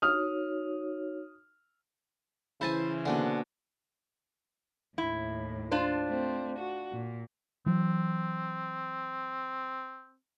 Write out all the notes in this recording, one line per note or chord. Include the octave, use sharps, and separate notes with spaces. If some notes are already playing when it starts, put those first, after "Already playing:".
D#4 F#4 C#5 D#6 F6
C#3 E3 E4 C5 G#5 A5
B2 D3 A#3 D4 C5 G#5 C6
D#2 A2 E4
D4 F4 C5
A3 C4
F#4
A#2
E3 F#3 C4